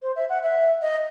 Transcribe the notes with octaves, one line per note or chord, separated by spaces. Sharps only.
C5
E5
F#5
E5
D#5